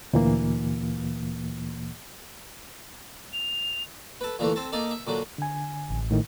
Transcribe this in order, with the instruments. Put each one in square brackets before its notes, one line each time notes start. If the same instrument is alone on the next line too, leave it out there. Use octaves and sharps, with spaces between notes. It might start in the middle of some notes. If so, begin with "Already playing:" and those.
[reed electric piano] D2 A#2 E3 A#3
[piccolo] F7
[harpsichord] A4 B4
A#2 D3 E3 A3
C4 A4
A#3 D#4 A4 D5
E5
A#2 D3 F#3
[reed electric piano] D3 G#5
[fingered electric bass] A1
[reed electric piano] A2 D#3